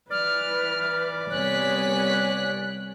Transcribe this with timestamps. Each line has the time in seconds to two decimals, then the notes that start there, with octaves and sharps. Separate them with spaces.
0.11 E3 B4 D5 F6
1.31 C2 B3 C#5 G#5 F#6 B6